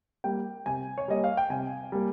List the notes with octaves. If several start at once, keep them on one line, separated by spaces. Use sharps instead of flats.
G3 A#3 G5
C3 G#5
C#5
G3 A#3 D#5
F5
G5
C3 G#5
G3 A#3